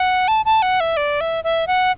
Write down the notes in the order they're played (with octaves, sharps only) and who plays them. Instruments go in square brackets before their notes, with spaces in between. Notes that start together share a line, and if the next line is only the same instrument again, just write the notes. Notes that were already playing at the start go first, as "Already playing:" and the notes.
Already playing: [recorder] F#5
A5
A5
F#5
E5
D5
E5
E5
F#5